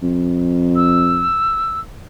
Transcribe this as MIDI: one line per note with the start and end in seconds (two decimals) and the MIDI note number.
0.02 1.37 41
0.76 1.80 88